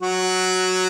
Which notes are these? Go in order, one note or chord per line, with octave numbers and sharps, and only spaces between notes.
F#3 F#4